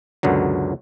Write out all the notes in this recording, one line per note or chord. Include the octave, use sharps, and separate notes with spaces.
C#2 F#2 B2 D3 F#3